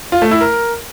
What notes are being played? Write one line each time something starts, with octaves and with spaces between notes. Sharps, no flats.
F4
A3
E4
A#4